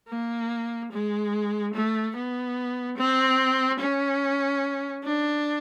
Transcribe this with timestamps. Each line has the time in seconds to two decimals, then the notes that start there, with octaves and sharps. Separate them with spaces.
0.08 A#3
0.92 G#3
1.74 A3
2.15 B3
2.97 C4
3.79 C#4
5.04 D4